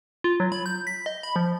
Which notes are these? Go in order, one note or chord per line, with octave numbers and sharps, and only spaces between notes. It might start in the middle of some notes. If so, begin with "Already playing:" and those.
F4
F#3
B5
G6
B6
D#5
B5
F3